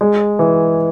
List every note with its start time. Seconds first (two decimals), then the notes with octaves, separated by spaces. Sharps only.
0.01 G#3
0.39 E3